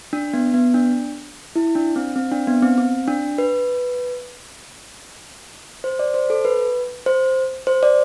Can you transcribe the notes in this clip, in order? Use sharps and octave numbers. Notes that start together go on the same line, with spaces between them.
D4
B3
B3
D4
E4
D4
C4
C4
D4
B3
C4
C4
D4
B4
C5
D5
C5
A4
B4
C5
C5
D5